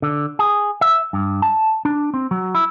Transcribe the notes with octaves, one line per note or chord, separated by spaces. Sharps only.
D3
G#4
E5
G2
A5
D4
C4
F#3
E4